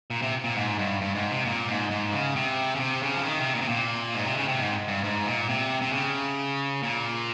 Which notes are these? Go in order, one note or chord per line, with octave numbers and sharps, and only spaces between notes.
A#2
C3
A#2
G#2
G2
G2
G#2
C3
A#2
G#2
G#2
C#3
C3
C#3
C3
C#3
F3
D#3
C3
A#2
C3
A#2
G#2
C3
C#3
C3
G#2
G2
G#2
A#2
C3
C3
C#3
A#2